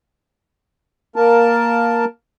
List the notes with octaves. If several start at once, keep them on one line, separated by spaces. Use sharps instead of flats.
A#3 A#4 A5